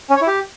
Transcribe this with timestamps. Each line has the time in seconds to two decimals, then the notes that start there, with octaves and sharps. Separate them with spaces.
0.10 C#4
0.16 C#5
0.22 E4
0.27 G4